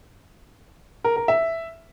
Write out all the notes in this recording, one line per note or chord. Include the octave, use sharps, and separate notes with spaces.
A#4
A#4
E5